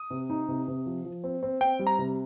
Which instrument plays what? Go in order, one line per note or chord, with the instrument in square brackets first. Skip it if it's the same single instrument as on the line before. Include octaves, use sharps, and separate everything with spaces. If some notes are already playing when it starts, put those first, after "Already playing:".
Already playing: [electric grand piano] D#6
[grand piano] C3
D#4
C3
C3
F3
F3
C4
C4
[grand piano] C4 [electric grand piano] G5
[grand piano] G3
[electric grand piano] A#5
[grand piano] C3